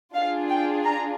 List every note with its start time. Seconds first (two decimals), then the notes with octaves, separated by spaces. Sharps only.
0.14 D4 F4 G#4 F5
0.49 G5
0.84 A#5